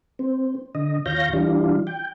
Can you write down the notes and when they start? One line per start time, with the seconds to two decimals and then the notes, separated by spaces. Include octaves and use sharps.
0.19 C4
0.75 D3 D#5
1.06 D#2 F4 C#5 F5 G6 A#6
1.33 E3 G3 D4 F4
1.87 G5